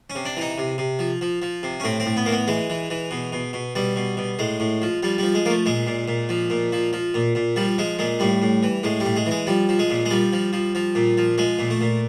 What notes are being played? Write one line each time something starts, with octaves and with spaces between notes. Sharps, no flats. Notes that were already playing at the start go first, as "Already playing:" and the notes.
C#4
C3
D4
E3 D#4
C3
C3
F3
F3
F3
C3
C#4
A2 C4
C4
A2
B3
E3 A#3
B3
E3 G#3
E3
E3
B2
B2
B2
B2 G3
B2
B2
A2 G#3
A2
F3
F3 G3
F3 G3
G#3
F3 A3 A#3
A#2 G#3
A#2
A#2
F3
A#2
F3
F3
A#2
A#2
F3 G3
F3 G#3
A#2 G#3
A2 G3
A2
E3
A2 G#3
G3
A2
G#3
E3 G#3
F3 G3
F3
G#3
A#2
G#3
F3 G3
F3
F3
F3
A#2
F3
F3 G#3
A#2
A3
A#2